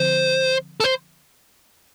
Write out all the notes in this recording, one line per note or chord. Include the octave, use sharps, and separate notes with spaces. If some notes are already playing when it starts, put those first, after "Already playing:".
Already playing: D3 F3 C4 C5
A4
C5